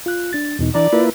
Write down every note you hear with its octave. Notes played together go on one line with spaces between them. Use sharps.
F4 F#6
D4 A6
E2 B2 D#4
E3 D4 D5 A#5
A#3 E4 F4 B4